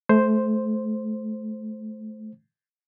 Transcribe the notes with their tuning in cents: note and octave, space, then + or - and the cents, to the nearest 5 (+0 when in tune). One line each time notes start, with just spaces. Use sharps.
A3 -25 C5 +0